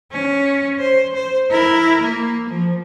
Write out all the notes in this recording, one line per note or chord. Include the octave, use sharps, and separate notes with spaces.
C#4
C5
C5
E4 A#4
A#3
F3